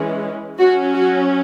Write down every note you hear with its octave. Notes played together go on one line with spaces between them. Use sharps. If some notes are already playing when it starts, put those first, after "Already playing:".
Already playing: E3 G#3 C#4
F#3 C#4 F#4
F#4